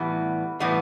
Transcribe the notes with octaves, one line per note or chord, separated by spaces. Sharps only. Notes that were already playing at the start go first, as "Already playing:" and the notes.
Already playing: A2 E3 G3 B3
A2 E3 G3 B3